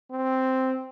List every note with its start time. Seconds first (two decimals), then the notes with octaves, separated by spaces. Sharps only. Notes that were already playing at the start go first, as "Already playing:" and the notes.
0.11 C4